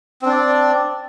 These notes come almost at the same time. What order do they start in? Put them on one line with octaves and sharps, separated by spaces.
C4 D4 D5